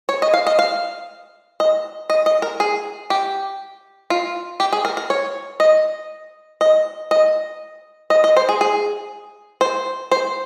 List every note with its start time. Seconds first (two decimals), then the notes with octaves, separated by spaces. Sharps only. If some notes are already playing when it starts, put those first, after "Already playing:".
0.09 C#5
0.22 D#5
0.34 F5
0.47 D#5
0.59 F5
1.60 D#5
2.10 D#5
2.26 D#5
2.42 A#4
2.60 G#4
3.10 G4
4.10 F4
4.60 G4
4.73 G#4
4.85 A#4
4.97 A#4
5.10 C#5
5.60 D#5
6.61 D#5
7.11 D#5
8.10 D#5
8.24 D#5
8.37 C5
8.49 G#4
8.61 G#4
9.61 C5
10.11 C5